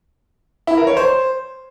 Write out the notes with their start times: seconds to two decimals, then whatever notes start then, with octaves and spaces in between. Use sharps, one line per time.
0.67 E4
0.77 A#4
0.87 C#5
0.97 C5